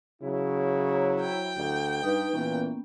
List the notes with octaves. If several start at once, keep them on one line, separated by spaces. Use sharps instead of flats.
C#3 F#3 E4
C5 C#5 A#5
G5
D2 G4
G2 D#4 B4
A#2 E3 A#3 B3 C#4